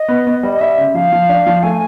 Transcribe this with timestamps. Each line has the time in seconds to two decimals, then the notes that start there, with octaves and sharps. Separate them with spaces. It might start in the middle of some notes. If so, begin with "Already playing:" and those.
Already playing: D#5
0.08 B3
0.27 B3
0.43 G3
0.54 D#5
0.61 G3 E5
0.78 C#3
0.94 F3 F5
1.12 F3
1.29 D4
1.46 F3
1.63 A3 G#5